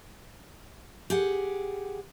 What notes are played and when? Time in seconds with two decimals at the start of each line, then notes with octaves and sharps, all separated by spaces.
1.10 G4 G#4 F#5